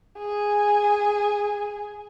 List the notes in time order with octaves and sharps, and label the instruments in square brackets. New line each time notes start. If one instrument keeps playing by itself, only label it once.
[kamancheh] G#4 G#5